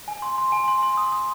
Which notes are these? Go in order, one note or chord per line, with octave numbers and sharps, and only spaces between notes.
G#5
C6
C6
G#5
C6
C6
D#6
D#6